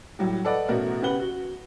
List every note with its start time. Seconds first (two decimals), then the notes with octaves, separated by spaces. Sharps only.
0.19 A2 F#3 G3
0.45 A4 B4 D5 D#5 F#5
0.69 A1 B2 A3 F#4 A#4
1.02 C#3 B3 G4 B4 F#5 G7
1.20 F#4